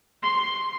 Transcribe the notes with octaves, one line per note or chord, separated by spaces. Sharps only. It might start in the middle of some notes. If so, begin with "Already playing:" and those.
C6